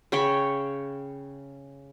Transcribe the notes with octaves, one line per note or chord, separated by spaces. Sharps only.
C#3 C#5 G5 B5